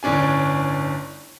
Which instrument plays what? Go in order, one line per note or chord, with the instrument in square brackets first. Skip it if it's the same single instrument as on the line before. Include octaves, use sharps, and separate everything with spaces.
[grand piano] G1 A2 C#4 D4 G#5